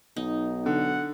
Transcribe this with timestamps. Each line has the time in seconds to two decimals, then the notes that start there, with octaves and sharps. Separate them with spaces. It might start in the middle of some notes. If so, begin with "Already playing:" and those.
0.16 B1 D#4
0.66 D3 F#5